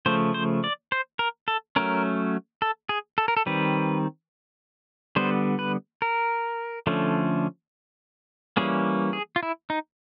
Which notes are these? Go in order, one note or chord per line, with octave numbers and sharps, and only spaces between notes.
C#3 F3 A3 C5
C5
D5
C5
A#4
A4
F#3 A3 C#4 A#4
A4
G#4
A4
A#4
A4
D#3 G3 C4 B4
D3 G3 B3 C5
B4
A#4
D3 F3 A3 C#4
E3 G3 A#3 C#4 G#4
G#4
F4
E4
D#4